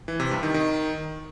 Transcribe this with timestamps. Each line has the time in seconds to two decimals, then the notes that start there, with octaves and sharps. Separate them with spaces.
0.08 E3
0.20 C3
0.31 G2
0.43 D#3
0.54 D#3